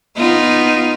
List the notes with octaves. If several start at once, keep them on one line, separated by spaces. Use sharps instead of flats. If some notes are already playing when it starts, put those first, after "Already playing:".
B3 D#4 F4